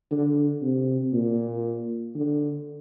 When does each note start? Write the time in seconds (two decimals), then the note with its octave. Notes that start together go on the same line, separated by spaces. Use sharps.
0.11 D3
0.62 C3
1.13 A#2
2.15 D3